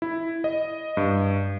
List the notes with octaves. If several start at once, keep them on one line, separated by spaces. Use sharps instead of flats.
E4
D#5
G2